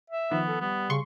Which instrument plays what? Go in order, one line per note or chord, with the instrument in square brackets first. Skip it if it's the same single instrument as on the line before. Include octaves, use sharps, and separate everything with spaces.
[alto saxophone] E5
[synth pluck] D#3 F3 [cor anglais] B3
[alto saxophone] A4
[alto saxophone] G3 [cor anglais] B3
[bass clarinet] C#3 [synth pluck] C6 C#6